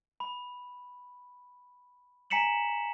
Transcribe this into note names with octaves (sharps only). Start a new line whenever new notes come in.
B5
G#5 A#5 B6 C#7 E7 F#7